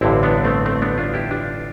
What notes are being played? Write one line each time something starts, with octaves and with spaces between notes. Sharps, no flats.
A1 G2 D3 C4 E4
B3 D4
A3 C4
A3 C4
B3 D4
D4 F4
E4 G4
D4 F4